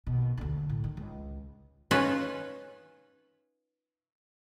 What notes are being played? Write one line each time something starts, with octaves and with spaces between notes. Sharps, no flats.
D#2 B2
D2 D3
A2
D#3
C#2
C#4 D#4 F4 B4